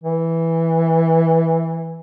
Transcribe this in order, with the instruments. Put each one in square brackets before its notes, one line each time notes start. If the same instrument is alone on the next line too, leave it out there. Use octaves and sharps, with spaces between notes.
[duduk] E3